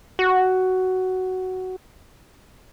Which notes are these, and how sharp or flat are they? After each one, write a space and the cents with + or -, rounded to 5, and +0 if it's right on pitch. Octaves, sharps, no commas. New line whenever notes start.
F#4 +10